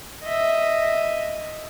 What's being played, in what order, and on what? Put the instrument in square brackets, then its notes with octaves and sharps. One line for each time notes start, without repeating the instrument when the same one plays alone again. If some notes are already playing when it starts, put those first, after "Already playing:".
[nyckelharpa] D#5 E5